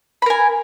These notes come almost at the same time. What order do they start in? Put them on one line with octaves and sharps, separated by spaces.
B5 A#4 G#5